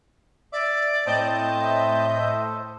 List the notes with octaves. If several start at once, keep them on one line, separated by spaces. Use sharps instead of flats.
D5 E5 D6
A2 C4 C5 D#5 A5 G6
E5
A4 C5